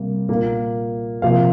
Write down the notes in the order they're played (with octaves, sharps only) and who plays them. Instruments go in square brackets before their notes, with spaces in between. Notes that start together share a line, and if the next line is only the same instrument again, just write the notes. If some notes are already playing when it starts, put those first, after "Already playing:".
Already playing: [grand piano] C3 G3 A#3
A#2 A#3
C3 F3 A#3 F5